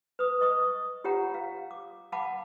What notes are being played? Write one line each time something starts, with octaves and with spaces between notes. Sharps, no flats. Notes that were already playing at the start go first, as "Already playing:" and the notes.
B4 D#6
D#5 C#6 D#6
F4 G4 C#5 F#5 A#5
F5
D6
F5 F#5 A5 B5 D6